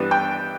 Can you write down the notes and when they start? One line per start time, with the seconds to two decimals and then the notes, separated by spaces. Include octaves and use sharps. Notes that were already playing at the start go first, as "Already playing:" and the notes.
Already playing: G2 E3 B3 D4
0.11 G5